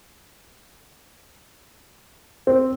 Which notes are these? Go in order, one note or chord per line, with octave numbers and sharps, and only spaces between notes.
C4